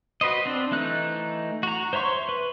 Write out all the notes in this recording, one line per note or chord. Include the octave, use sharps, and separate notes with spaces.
F#4 B4 C5 D#5
C4 D4
E3 A3 D#4 F#6
F#4 A#5
C5 C#5 E5 C6 C#6
B4